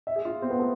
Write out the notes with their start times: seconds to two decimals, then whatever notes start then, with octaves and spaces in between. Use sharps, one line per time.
0.07 E5
0.16 G#4
0.25 F4
0.42 C4
0.50 B3
0.59 A3